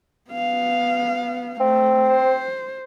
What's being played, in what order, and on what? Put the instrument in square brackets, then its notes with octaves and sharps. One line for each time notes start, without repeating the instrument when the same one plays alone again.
[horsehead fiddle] B3 F5
[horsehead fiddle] A3 [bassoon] C4
[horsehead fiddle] C5